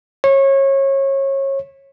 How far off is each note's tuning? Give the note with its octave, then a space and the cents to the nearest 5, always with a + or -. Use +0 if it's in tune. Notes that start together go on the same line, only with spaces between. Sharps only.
C#5 -25